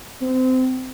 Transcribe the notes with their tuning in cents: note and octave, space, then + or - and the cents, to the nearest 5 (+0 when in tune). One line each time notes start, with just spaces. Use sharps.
C4 -25